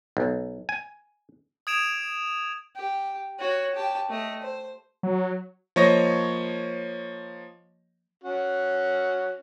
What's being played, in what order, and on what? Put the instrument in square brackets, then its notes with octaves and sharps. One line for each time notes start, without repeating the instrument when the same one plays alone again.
[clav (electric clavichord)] B1
G#5
[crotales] D#6 G#6 D7 E7 F7
[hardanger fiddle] G4
F#4 C#5
G4 A5
A3 D#5
C5
[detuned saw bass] F#3
[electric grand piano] F3 A#3 C#5 D#5 C#6 A#6
[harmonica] C#4 F#4